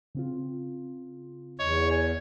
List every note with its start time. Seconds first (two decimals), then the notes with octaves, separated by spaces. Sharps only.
0.15 C#3 C4 F4
1.59 E2 C#5 D#5
1.91 G#5